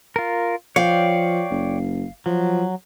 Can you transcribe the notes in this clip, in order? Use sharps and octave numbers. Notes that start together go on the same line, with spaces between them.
F4 A#4
F3 C#5 D5 F5 G5
F#1
F3 F#3